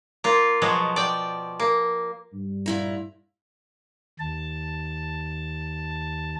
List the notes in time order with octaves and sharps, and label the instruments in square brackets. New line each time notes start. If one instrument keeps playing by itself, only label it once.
[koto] A#3 F4
B2 F3 F#3 G#3
D5 G5
A#3
[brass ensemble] G2
[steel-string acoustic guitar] A#2 E4 A#5
[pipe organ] D#2 A5